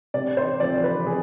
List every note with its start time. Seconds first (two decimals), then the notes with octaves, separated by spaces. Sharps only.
0.14 C3 D5
0.37 C5
0.60 F3 C4 D5
0.84 B4
1.06 C3 G#4